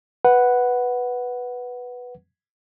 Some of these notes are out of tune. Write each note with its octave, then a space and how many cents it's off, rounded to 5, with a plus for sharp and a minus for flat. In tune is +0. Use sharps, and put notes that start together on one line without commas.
B4 +0 F#5 +0